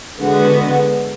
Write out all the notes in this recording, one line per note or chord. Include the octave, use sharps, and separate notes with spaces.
D3 G#3 B3 F#4